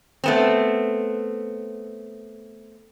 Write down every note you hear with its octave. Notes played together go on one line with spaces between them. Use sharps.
A3 B3 C4